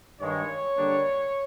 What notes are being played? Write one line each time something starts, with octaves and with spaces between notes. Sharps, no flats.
G2 D#3 G#3 C#5
D3 G3 A#3 D4